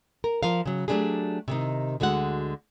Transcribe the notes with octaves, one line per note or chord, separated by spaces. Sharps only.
A#4
F3 A#4 F5
C#3 F#3
F#3 A3 B3 D4 G4 G#4
C3 D#3 D#4
D2 D3 G#3 F#4 F#5